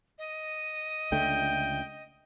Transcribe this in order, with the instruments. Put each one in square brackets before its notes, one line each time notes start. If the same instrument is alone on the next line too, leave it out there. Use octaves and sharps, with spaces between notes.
[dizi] D#5
[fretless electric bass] C#2 D3 A3 [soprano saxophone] G5